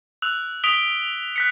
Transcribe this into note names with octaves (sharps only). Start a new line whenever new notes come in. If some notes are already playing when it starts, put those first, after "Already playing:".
E6 F#6 F7
D#6 B6 D7 F7 G7
F#6 B6 C#7